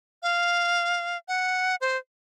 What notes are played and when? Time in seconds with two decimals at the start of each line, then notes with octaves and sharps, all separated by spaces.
0.23 F5
1.28 F#5
1.81 C5